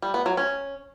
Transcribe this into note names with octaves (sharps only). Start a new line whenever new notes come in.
G3
B3
F#3
C#4